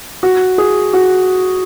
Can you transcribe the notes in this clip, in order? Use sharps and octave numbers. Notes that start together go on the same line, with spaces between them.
F#4
G#4
F#4